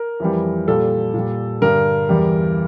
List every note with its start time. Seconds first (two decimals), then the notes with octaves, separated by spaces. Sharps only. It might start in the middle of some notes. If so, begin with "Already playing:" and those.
Already playing: A#4
0.20 F2 E3 G3
0.67 A#2 G3 A4
1.14 A#2 G3
1.61 G2 D3 G3 A#4
2.09 E2 E3 G3